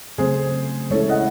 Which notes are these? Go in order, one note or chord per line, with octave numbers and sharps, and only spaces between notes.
C#3 F#3 A3 C4 G#4 C5
G#3 C#4 E4 A4 C#5
D#5 F#5